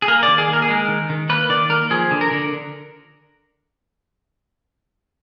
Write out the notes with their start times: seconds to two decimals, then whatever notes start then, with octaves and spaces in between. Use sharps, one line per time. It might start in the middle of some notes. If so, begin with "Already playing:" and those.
0.02 G#4
0.08 A#3 A#4
0.23 D#3 D5
0.38 G#4
0.48 A#3 A#4
0.62 G#4
0.68 G#3 A#4
0.88 D#3
1.09 D#3
1.29 A#3 B4
1.49 D#3 D5
1.70 A#3 A#4
1.90 F3 G#4
2.11 D3
2.21 A#4
2.31 D3